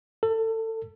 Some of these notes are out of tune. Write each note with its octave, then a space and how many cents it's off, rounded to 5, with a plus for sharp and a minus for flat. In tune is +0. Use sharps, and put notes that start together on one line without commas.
A4 +25